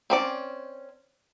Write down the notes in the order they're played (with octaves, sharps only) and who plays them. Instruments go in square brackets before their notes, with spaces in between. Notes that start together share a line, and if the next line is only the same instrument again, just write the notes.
[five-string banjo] C4 C#4 D5